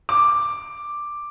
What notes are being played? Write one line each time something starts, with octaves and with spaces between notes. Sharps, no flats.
D6